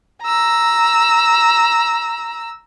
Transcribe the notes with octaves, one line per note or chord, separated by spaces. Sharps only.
A#5 E6